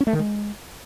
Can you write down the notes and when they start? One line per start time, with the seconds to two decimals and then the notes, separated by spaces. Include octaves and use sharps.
0.01 C#4
0.07 A3
0.13 D#3
0.19 G#3